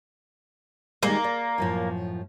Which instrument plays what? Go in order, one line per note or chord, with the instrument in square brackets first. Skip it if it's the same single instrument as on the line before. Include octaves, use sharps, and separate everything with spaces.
[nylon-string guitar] D#3 G3 G#3 [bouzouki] A#3
[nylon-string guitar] D5
F#2 A2 F3